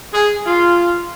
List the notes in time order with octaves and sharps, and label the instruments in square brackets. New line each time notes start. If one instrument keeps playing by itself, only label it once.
[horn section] G#4
F4